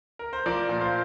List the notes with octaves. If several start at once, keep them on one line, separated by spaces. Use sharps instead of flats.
A#4
C5
F3 A#4 D5
A#2
C5 F5